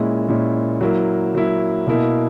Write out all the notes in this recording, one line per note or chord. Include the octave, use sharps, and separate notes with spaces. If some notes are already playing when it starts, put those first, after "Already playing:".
Already playing: A#2 G#3 C#4 E4
A#2 G#3 C#4 E4
F#3 A#3 E4
F#3 A#3 E4
B2 A#3 E4